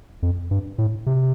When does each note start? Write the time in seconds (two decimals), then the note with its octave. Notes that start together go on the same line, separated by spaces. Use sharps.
0.22 F2
0.51 G2
0.78 A2
1.06 C3